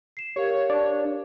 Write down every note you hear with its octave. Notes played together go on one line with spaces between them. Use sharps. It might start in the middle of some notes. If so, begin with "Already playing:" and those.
C7 E7
G4 A#4 C#5 F5
D4